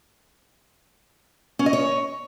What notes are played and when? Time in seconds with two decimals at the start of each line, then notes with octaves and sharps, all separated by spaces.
1.59 C#4
1.66 D#5
1.73 C#5